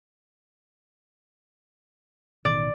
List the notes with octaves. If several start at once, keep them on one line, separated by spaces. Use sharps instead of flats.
A1 B2 D#3 D5